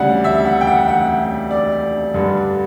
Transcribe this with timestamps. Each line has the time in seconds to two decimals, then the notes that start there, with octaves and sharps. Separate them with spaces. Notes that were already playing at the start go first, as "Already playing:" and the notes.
Already playing: D2 C#3 G3 D5 F#5
0.24 E5
0.45 F#5
0.61 G5
0.67 F#5
0.88 F#5
1.51 D5
2.14 G2 D3 G3